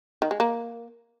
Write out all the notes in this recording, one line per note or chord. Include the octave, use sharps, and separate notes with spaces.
D#3
G#3
A#3